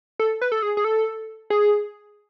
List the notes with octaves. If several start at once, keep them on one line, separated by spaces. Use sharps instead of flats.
A4
B4
A4
G#4
G#4
A4
G#4